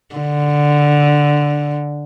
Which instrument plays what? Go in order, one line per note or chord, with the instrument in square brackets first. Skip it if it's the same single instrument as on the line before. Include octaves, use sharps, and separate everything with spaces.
[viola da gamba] D3